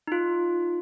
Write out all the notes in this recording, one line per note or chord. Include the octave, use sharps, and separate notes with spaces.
D#4 F4